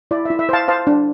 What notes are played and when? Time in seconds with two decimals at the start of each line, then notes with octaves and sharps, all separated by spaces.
0.11 E4 D5
0.25 E5
0.30 E4
0.39 E5
0.49 C5 F5 A5
0.68 C5 F5 A5
0.87 D4